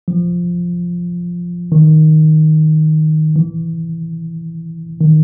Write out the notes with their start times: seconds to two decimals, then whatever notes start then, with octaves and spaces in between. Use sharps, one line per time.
0.08 F3
1.72 D#3
3.36 E3
5.01 D#3